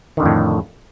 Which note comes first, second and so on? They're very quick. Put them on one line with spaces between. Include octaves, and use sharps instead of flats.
D#3 D3 F2 A2